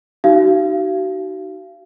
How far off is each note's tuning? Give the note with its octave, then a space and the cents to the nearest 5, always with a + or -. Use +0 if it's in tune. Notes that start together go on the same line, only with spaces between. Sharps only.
D#4 -5 F#4 +35 F5 -30